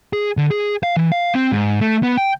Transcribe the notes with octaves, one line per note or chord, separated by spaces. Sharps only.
G#4
D3
G#4
F5
E3
F5
C4
G#2
A3
B3
G5